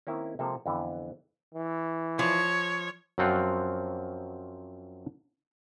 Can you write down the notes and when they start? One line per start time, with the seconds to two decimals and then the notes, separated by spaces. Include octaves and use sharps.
0.07 D#3 A#3 C4 C#4 E4 A#4
0.39 C3 F3 G#3 A#3 C4 A4
0.66 F2 D3 E3 B3
1.54 E3
2.19 F3 C#5
3.18 F#2 F3 F#3 C4 F4 F#5